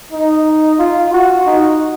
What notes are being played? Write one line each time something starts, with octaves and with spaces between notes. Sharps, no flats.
D#4
F4
F#4
D#4